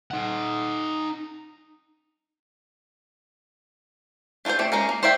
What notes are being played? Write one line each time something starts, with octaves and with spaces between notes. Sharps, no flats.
D#4 F#5
D4 F4 F#4 A4 C5
A3 C4 D5
G#3 C#4 A#4
A#3
C5 D5 E5 F5 G5